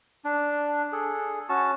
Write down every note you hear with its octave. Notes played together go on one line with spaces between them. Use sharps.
D4
G#4 A4
C#4 F#4 A5